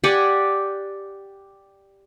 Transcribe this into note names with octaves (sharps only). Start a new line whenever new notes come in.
G4 D5 F#5 G#5